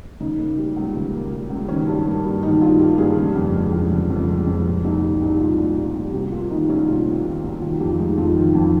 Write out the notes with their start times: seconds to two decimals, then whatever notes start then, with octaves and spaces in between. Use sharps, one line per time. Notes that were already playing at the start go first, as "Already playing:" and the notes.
0.20 C#3 D#4
0.39 A#3
0.58 G3
0.76 C#2
0.95 C#3
1.14 A#3
1.32 G3
1.50 C#2
1.68 D#3 C#4
1.88 G2
2.06 A#3
2.24 G2
2.42 D#3 D#4
2.61 G2 F4
2.79 A#3 G4
2.98 G2 G#4
3.17 C#3
3.36 F2
3.54 G#3
3.72 F2
3.91 C#3
4.10 F2
4.28 G#3
4.47 F2
4.65 A#2
4.84 C2 D#4
5.02 G3
5.21 C2 D#4
5.40 A#2 F4
5.58 C2
5.76 G3
5.95 C2
6.13 C3 G4
6.32 A#3 F4
6.51 D#3 D#4
6.69 C2 C#4
6.88 C3 F4
7.06 A#3
7.24 D#3
7.44 C2
7.62 D#3 F4
7.80 F2 G4
7.99 G#3 D#4
8.17 F2 F4
8.36 D#3
8.55 F2